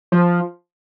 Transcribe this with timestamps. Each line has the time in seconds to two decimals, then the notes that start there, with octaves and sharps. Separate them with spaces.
0.12 F3